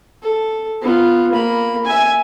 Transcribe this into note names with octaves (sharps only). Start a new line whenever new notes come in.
A4
B3 F4
A#3 B5
E5 G#5